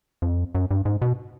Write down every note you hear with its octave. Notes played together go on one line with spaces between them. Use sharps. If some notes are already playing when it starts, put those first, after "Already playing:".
F2
F#2
G2
G#2
B2